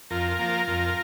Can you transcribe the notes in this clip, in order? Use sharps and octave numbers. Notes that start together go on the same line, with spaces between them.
F2 F4 A#4
F3 A#3
F2